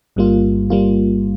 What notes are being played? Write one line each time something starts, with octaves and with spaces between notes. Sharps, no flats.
G1 G2 G3 A#3 F4
G3 A#3 F4